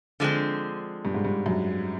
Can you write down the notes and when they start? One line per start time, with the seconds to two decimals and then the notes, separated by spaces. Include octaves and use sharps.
0.20 D3 F3 G#3 C4
1.05 G2
1.14 G#2
1.25 G2
1.46 F#2